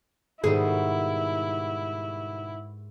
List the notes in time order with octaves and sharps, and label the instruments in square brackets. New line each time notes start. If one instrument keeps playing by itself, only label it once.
[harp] G#2 [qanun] B2 D#3 G3 [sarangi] E4 [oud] G#4